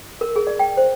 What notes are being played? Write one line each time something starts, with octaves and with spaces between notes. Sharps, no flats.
A#4
G#4
D5
G5
C5